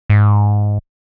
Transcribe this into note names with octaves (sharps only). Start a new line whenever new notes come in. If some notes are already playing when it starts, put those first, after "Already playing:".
G#2